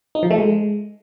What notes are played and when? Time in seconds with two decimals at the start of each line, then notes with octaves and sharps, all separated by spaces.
0.15 D#4
0.23 F3
0.31 A3
0.38 G#3